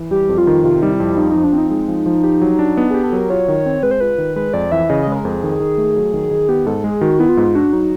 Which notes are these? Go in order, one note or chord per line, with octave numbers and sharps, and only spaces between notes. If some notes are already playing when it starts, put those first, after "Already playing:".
Already playing: E3
G3 G4
F2
F4
D#3
C3 F4
G3 D#4
E4
F2
F3 D#4
D#4
F3
D4
C4
D#4
G#3 D#4
F3
F3
G4
F#3
D4
B3 D#4
G4 G#4
A4
F#3 A#4
F4 C#5
D#3
C4
G#3 B4
C5
F4 B4
D#3
G#3 B4
F2 D5
E3 E5
C#3 D#5
G#3 D#5
B4
A#4
F2 G#4
D#3
D#3
A3
F#3
D#3
D#3
B3 G4
G#2 A4
G#3 G#4
D#3 F#4
B3 E4
F4
G#2
D4 F#4
F#3 D#4